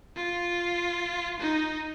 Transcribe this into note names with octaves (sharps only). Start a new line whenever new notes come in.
F4
D#4